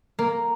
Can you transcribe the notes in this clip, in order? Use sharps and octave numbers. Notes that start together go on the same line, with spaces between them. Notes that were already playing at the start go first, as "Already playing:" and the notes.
A#3